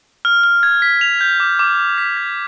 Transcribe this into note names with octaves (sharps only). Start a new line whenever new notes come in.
F6
F6
G#6
B6
F7
G6
D6
D6
D6
B6
G#6